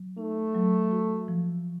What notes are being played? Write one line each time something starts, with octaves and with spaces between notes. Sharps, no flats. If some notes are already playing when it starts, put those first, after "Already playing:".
Already playing: F#3
A3 D#4
F#3
F#4
F3